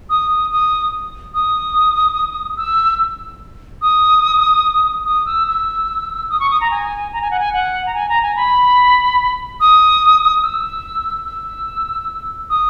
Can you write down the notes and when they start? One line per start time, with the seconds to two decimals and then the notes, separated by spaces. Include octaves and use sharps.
0.10 D#6
0.51 D#6
1.34 D#6
2.57 E6
3.82 D#6
5.06 D#6
5.26 E6
5.48 E6
6.30 D#6
6.40 C#6
6.51 D#6
6.61 A#5
6.71 G#5
7.13 A#5
7.21 G#5
7.31 F#5
7.40 G#5
7.54 F#5
7.86 A#5
7.94 G#5
8.09 A#5
8.22 G#5
8.36 B5
9.60 D#6
10.43 E6
11.25 E6
12.50 D#6